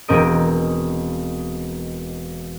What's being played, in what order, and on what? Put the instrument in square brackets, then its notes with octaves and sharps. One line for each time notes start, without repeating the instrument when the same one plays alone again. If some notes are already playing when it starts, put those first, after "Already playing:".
[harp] E1 C4 A#4 D#5 D7